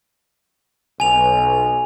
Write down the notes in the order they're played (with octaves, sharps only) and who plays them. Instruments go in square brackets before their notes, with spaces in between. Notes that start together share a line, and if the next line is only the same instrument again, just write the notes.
[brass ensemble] B1 [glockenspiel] G#5 F7